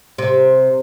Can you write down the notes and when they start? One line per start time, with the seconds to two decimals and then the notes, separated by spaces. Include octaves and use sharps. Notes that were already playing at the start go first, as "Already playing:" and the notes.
0.18 C3